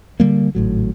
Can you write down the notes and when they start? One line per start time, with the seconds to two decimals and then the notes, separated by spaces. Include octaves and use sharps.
0.20 D3 F#3 G3 A#3
0.55 G#1 A2 F#3